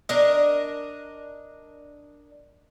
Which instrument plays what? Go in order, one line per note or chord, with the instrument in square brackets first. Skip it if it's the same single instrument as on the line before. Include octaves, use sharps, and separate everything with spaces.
[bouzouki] D4 A#4 D#5